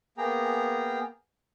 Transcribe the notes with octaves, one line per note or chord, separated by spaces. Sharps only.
A#3 B3 G#4 G5 A#5